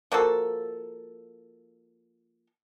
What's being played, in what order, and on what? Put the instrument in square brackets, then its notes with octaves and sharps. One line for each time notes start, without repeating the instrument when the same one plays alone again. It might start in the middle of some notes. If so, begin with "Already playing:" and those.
[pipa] F3 A#3 F#4 A4